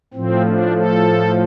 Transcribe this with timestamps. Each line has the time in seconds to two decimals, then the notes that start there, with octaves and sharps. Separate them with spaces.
0.14 A2 F3 C4
0.45 D4
0.76 A4